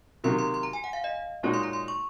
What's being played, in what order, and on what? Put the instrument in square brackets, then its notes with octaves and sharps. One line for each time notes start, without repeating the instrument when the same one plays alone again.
[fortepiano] C3 D#3 F#3 A#3 [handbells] C6
[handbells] C6
C6
A#5
G#5
F#5
F5
D#5
[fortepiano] A#2 G#3 D#4 F#4 [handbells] C#5
[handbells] C6
A#5
C6
C#6